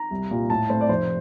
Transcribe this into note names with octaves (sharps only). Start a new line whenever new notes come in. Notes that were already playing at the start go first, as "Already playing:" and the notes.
Already playing: A#5
C2
A#2 G3 A#3
A2 A5
A3 C4 C5
D5
F1 C5